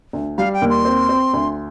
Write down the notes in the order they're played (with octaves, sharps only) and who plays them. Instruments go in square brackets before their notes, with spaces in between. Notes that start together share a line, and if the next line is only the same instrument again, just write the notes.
[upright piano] D2
[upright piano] G3 [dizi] F5
[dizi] G5
[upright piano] D#2
[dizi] C6
[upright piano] C4
C4
D2